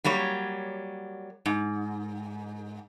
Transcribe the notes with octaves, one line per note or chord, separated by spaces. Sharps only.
F#3 G3 A#3 C#5
G#2